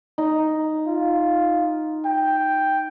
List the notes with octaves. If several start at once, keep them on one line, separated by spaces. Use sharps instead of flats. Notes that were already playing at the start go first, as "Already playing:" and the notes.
D#4
F4
G5